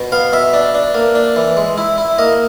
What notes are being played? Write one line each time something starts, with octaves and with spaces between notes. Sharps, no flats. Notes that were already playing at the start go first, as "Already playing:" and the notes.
Already playing: B2
B3 F5
B2 E5
D4
D4
A#3
D4
E3
G#3
E4
E4
A#3 D#5